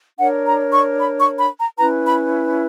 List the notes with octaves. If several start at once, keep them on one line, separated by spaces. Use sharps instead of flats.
D4 A#4 C#5 F#5
A#5
C#6
B5
C#6
B5
A#5
C#4 E4 B4 A#5
B5